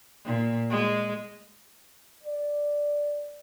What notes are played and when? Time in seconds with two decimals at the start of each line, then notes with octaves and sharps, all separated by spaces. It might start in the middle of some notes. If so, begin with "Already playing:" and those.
0.26 A#2
0.70 G#3
2.23 D5